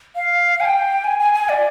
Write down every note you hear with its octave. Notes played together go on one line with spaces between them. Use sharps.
F5
G#5
G5
G#5
G#5
G#5
D5